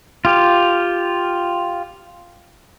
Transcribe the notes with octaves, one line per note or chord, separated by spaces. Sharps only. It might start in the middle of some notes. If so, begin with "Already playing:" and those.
F4 G4